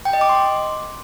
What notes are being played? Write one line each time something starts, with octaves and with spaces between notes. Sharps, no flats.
G5
D#5
D6
C6